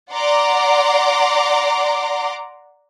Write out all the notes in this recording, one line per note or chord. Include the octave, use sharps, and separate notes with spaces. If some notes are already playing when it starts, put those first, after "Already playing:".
D5 F#5 A#5 C6 D6